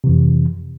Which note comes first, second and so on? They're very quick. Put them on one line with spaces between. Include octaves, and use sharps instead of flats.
C3 E3 F2